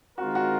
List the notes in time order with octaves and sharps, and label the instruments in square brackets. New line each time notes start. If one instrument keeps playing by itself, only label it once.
[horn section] D#3 G#3 C4 F4 A#4 [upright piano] F#4
[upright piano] F#4